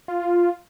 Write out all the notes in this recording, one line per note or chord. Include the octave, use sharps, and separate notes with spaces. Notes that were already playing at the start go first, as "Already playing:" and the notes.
F4